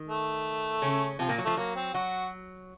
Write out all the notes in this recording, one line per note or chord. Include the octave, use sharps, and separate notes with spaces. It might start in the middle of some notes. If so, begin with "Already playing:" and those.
Already playing: D#3
A3
C#3 C#4
C3 F3 C4
A#2 A#3
F#3
F3 A3
F#3 A#3
C4
F#3 F#4